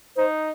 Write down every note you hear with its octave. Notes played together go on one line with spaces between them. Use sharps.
D#4 C5